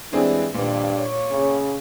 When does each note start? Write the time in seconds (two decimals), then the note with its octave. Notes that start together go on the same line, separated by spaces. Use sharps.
0.13 E3 G3 G#3 C4 D4 G#4
0.54 G2 A#2 D#3 F3 B4
0.97 C#5
1.30 C#3